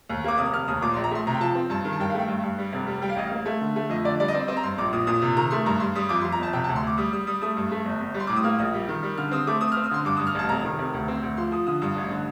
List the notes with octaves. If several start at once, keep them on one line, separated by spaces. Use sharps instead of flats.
D#2
A#3 D6
F1 D#6
F1 F6
D#2 D#6
A#2 D6
C6
A#1
A#5
A3 C6
C3 A#5
G5
F3 A5
C4
G2 A5
D#3
A5
G2 G5
F5
A3
G5
G2
G2
G3
F1
G3
G3 G5
F5
A1 D#5
F5
A#3
A3
D3
A3
F2 D#5
D3 D5
G3 D5
D#5
C4 D5
C4 D#5
A#5
G2 C6
A#1 D6
A#2 D#6
A#2 D#6
C3
D#3 A#5
A3 C6
G2 A#5
G2 C6
G3 D#6
F2 D6
C6
F2
A#5
G1 A5
C3 G5
A5
D2
C6
D2 D6
G3 D#6
G3 D#6
G3 D#6
A3 D#6
G2
A3
G1
G1
G3
C6
A2 D6
D#6
A#3 F6
A#1 D#6
G3
D#3
G3
D3 F6
C4 D#6
A3 D6
C4 D#6
F6
C4
D#6
D3 C6
G2 D6
D#6
G2
F6
A1 A5
F1 A#5
D#3
F1
D2
C4
D2
F3 C6
F3 D#6
D3 D#6
G2 D#6
A1
D3